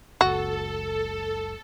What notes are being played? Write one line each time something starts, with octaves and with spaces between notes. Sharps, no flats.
F#1 C#2 F#4 A4